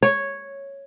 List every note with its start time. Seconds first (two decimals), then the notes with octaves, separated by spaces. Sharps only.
0.03 C#5